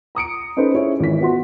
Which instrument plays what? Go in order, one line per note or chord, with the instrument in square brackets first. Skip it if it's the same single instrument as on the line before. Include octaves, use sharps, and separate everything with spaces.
[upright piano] A#5 D#6 C#7 D7
C#4 D#4 A4 B4 C5
C#4 E4 G#4 C#5
G#1 E3 B6
B3 F#4 C6